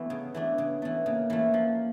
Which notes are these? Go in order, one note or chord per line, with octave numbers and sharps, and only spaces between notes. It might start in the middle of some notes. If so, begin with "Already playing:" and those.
Already playing: E3 A3 B3
C#3
E3 A3 D4
C#3 B3
E3 A3 B3
C#3 A#3
E3 A3
F3